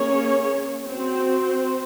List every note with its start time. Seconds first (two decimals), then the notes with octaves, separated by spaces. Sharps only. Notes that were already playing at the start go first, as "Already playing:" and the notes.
Already playing: A#3 C#4 G#4 C#5
0.88 C4 F#4 C5